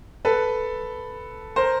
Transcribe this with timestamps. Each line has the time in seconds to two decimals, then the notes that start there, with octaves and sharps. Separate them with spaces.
0.25 A4 B4
1.56 A#4 C5